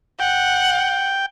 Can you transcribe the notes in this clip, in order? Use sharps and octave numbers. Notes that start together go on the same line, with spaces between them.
F#5 G5